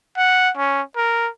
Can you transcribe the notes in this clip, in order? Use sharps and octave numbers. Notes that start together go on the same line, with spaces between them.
F#5
C#4
A#4